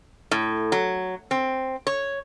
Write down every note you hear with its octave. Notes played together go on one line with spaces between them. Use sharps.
A2
F#3
C4
C#5